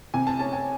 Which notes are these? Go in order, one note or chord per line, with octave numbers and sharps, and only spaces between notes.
C3 G#5
A5
C#4 A5
G#5